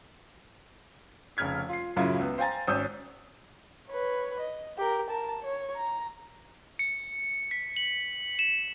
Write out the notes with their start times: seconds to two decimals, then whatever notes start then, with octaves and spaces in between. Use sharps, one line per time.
1.37 F1 C#3 F6 G#6 B6
1.69 F4 C7
1.96 F#2 A2 C#3 F#3 E4 F4
2.19 C#2 B3
2.38 C5 F5 G5 G#5 A#5 A6
2.67 G#1 C#4 D#6 E6 G6
3.88 B4 C#5
4.40 D#5
4.78 G4 A#4
5.10 A#4 A5
5.42 C#5
5.75 A#5
6.79 C#7
7.51 B6
7.77 F#7
8.39 E7